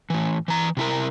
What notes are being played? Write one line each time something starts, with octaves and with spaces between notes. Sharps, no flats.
A2 E3
E3 A#5
C3 E4 A#4